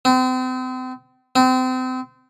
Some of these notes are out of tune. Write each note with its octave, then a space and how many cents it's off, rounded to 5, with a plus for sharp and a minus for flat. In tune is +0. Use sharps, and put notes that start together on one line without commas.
C4 -35
C4 -30